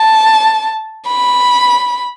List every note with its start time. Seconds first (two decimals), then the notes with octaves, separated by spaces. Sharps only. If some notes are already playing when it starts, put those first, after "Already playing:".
Already playing: A5
1.08 B5